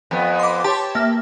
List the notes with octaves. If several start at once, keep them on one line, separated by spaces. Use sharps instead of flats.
F2 B3
C6 D6
G4 C#5 A5
A#3 E5